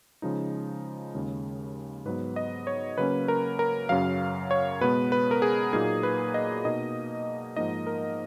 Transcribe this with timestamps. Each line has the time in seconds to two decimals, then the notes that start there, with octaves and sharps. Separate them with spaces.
0.22 C#3 F3 G#3 D#4
1.14 D#2 C#3 G#3
2.05 G#2 F#3 B3 B4
2.36 D#5
2.67 C#5
2.98 C#3 F#3 A#3 C#4 B4
3.28 A#4
3.59 A#4
3.89 F#2 C#3 F#3 F5
4.51 C#5
4.81 B2 G#3 B3 B4
5.12 B4
5.31 A#4
5.42 G#4
5.73 A#2 F#3 A#3 D#4 G#4
6.03 B4
6.34 D#5
6.64 B2 A#3 D#4 D#5
7.56 G#2 F3 A#3 D#4 D#5
7.87 A#4